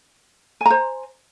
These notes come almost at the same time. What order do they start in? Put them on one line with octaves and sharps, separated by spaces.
G#5 A#5 C5